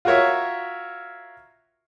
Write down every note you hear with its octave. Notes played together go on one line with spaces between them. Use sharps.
F4 F#4 A#4 C#5 E5